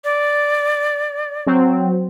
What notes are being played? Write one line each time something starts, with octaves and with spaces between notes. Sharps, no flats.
D5
F#3 C4